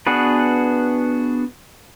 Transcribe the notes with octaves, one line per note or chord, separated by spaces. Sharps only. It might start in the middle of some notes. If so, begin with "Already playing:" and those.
B3 D4 F#4 G#4 B4